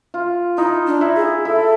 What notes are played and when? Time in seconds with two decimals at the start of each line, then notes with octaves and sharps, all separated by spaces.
0.14 F4
0.57 D#4 E4
0.87 D4
1.01 E4
1.16 G#4
1.45 E4 A4